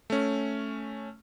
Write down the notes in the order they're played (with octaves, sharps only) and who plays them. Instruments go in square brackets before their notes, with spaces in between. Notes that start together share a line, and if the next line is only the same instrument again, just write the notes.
[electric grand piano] A3 C#4